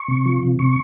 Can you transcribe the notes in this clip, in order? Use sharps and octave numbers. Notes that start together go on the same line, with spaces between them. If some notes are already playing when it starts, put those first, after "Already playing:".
Already playing: C#6
C3
F3
C3
C3 C#6